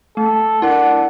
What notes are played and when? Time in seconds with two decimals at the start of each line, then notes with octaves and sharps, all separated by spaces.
0.17 A3 A4
0.62 D4 E4 A#4 F#5